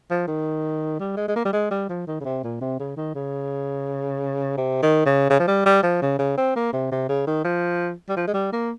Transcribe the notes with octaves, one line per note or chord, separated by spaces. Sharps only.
F3
D#3
G3
G#3
G#3
A#3
G3
G#3
G3
F3
D#3
C#3
C3
A#2
C3
C#3
D#3
C#3
C3
D#3
C#3
C#3
F3
G3
G3
F3
C#3
C#3
C4
A#3
C3
C3
C#3
D#3
F3
G3
F3
G#3
G3
A#3